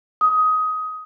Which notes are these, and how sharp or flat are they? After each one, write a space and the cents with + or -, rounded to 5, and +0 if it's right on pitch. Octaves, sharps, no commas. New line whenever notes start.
D#6 +15